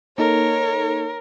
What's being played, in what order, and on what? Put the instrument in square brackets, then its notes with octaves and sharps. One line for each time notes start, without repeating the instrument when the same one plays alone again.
[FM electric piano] A#3 D#4 A4 [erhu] A#4 [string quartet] C#5